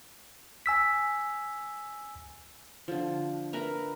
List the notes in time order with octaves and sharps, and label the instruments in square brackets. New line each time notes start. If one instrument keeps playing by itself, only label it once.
[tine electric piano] G#5 E6 B6
[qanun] D3 F3
A#4 B4 E5 A#5